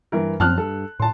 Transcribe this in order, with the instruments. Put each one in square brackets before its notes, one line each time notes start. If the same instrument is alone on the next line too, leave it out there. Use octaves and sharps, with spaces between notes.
[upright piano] G2 E3 A#4
[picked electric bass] F#2 F3 C4 [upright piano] A5 F6 F#6
[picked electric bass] G2 [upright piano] A4
[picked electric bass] A2 [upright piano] A5 C6